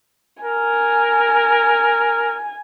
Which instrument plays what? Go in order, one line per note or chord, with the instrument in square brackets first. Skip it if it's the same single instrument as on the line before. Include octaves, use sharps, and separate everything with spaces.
[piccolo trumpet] A#4 [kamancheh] G#5